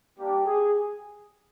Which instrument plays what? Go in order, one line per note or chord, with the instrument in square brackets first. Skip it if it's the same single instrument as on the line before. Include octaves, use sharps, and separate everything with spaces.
[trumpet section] G3 A#3 D4 G4
G#4